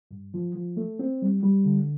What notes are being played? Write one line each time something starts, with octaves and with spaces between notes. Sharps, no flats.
G2
F3
F3
A3
C4
G3
G3
D3